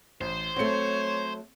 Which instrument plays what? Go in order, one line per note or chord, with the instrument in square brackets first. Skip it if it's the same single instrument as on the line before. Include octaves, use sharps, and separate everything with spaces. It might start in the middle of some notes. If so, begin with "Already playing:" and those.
[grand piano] A1 [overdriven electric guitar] C5
[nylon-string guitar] F#3 A3 [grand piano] C4 C#7 [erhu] C#5